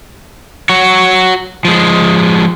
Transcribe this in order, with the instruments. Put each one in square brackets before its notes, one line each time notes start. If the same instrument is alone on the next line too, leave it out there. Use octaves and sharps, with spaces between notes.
[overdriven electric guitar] F#4 C#5
F3 G#3